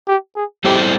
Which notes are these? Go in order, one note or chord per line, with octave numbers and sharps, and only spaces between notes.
G4
G#4
G3 C4 E4 G4 A4 C5